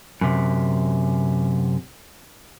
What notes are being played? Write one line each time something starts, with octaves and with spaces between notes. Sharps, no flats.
F#2 C3